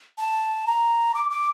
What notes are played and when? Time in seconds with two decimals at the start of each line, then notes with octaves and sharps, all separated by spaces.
0.18 A5
0.67 A#5
1.15 D6
1.30 D6